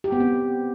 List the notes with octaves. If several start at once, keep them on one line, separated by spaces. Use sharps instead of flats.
G4
B3
C4